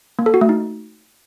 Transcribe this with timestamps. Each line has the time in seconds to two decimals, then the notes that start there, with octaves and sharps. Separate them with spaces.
0.19 A#3
0.26 A4
0.34 F#4
0.41 A3
0.49 D#4